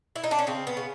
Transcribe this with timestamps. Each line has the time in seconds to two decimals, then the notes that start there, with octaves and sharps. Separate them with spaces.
0.16 E4
0.24 D#4
0.31 D4
0.39 C#4
0.47 C#3 C4
0.67 B3
0.77 C#3